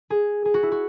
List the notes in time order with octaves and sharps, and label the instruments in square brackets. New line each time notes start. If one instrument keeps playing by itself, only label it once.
[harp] G#4
G#4
F#4
E4
F#4